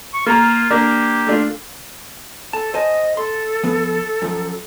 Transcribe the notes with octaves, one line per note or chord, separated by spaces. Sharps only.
C#6
A#3 F4 A#5
A#3 D4 G4 A#4
A3 D4 F4
A4 A5
C5 D#5 G#5 A5
A4 C6
F3 B3
F#2 F3